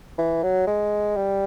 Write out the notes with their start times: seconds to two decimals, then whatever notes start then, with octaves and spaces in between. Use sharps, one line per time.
0.18 E3
0.43 F#3
0.67 G#3
1.16 G3